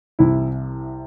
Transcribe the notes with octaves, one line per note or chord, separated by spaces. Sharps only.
C2 C3 E3 E4